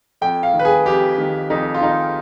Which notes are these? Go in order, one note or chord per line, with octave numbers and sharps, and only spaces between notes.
F2 G5
F5
D#3
B4
G#4
F2 G4
D#3
F2 D#4
F4
D#3 D#4